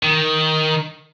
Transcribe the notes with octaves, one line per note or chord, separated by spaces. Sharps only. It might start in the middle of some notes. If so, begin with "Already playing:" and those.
D#3